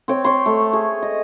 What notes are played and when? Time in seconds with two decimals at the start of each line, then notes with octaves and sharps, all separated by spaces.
0.08 C4 C#5 G5
0.24 C#5 C6
0.46 A3
0.73 G#4
1.02 D#5